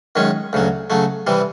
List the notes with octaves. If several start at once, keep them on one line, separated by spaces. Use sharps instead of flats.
F#2 D#3 G#3 C#4
D2 C#3 F#3
C#3 F#3 A3
C3 E3 G3